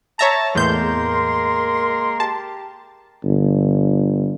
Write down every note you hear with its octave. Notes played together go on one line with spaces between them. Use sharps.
C#5 E5 A5 A#5
E2 A2 G#3 A#3 A#4 C6 G6
G4 A5
G1